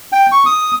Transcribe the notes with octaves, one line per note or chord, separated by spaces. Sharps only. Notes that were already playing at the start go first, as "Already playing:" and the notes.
G5
C#6
D#6